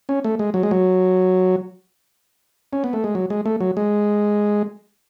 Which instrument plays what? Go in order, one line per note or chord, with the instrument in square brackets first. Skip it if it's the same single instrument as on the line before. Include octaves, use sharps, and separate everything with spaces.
[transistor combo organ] C#4
A3
G#3
F#3
G#3
F#3
C#4
B3
A3
G#3
F#3
G#3
A3
F#3
G#3